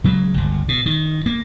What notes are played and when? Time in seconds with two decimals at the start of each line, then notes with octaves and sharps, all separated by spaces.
0.04 C#3 F#3 G#3
0.34 G1 C#2
0.68 B2
0.86 D#3
1.26 A#3